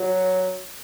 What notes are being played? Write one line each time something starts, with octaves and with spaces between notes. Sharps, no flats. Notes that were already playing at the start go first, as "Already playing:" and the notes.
Already playing: F#3